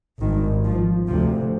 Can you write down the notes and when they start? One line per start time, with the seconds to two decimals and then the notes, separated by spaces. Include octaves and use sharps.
0.22 G#1 G2 D#3
0.64 F3
1.07 D2 C3 F3